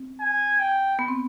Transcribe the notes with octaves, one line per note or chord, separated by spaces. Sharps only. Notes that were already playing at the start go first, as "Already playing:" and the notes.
Already playing: C4
G#5
G5
B3
C4